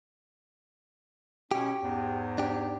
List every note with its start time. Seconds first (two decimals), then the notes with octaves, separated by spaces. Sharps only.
1.51 B2 C#4 G4
1.81 E2 G#2
2.38 D4 G4